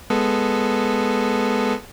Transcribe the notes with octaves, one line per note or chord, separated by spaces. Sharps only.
G#3 B3 A4